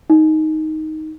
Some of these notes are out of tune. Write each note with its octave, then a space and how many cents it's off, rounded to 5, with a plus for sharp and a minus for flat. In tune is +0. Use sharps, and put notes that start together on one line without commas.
D#4 +5